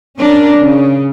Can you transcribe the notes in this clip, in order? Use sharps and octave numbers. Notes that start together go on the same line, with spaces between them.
C#4 D4 A#4
C#3